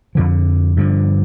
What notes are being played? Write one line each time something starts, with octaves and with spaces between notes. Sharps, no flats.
F2 D3 F3
G2 D3 F3